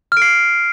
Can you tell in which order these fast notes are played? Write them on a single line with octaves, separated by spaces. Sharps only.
F6 D7 C7